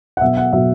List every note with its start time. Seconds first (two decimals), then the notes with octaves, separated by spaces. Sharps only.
0.17 F#5
0.21 B2 F#3 B3 E5
0.37 F#5
0.53 B2 F#3 B3 E5